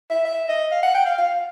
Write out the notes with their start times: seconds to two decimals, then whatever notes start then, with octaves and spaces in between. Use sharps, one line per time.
0.10 E5
0.25 E5
0.48 D#5
0.71 F5
0.83 F#5
0.94 G5
1.06 F5
1.18 F5